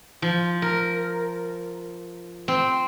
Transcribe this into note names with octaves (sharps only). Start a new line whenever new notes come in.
F3
A#4
C4